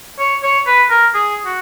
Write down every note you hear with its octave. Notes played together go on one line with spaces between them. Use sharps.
C#5
C#5
B4
A#4
G#4
F#4